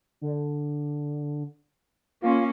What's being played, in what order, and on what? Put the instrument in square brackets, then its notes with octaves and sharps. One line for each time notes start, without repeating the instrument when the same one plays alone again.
[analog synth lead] D3
[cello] A#3 C#4 [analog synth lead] F4